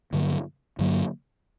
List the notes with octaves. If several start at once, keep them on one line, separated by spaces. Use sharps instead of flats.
G2 D3 F#3 A#3
G2 D3 F#3 A#3